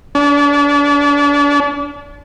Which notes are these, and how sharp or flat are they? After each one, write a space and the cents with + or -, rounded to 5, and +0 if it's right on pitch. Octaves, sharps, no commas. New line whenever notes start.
D4 -35